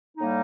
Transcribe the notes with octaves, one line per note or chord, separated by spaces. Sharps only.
A2 G3 A#3 D#4